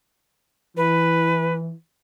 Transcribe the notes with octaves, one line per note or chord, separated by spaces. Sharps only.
E3 B4